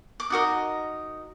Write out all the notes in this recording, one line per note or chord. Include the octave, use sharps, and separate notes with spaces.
D6
D#4 F#4 A#4 D#5